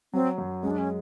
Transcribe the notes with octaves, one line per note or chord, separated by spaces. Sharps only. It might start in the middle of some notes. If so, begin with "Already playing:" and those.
F#3 C4
F#2
G#3 C#4
D4
C#4